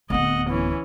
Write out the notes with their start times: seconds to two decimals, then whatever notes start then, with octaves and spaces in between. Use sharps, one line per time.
0.10 D1 B3 D#5 F#5
0.49 E3 C#4